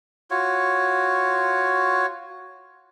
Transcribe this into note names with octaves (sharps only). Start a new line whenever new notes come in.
F4 F#4 C#5